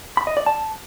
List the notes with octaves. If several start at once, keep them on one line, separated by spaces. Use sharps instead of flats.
B5
D#5
D5
A5